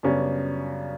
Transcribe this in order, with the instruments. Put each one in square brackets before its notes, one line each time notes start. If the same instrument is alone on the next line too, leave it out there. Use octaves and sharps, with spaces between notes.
[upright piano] F#2 C#3 G3 B3 D4 [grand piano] C#4